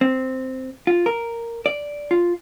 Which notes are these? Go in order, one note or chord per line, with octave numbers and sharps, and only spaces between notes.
C4
F4
A#4
D5
F4